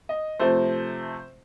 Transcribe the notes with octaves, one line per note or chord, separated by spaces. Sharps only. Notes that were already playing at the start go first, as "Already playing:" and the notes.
D#5
C3 F3 A3 C5